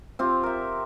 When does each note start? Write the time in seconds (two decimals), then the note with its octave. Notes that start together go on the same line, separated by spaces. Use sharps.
0.19 C4 F4 G4
0.43 A#4 E5